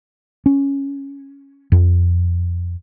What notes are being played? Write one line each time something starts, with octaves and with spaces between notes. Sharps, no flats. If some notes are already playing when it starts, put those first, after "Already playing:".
C#4
F2